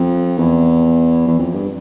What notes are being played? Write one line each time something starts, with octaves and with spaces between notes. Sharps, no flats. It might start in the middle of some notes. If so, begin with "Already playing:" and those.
Already playing: F2
E2
E2
F2
G2